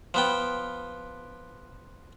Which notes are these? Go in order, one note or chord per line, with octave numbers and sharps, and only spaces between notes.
F3 B3 G5